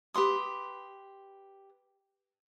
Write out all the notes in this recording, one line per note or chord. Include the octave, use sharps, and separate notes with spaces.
G4 B4 C6 D#6